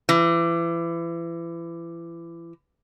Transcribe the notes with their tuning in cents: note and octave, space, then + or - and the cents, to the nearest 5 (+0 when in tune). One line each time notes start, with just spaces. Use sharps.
E3 +30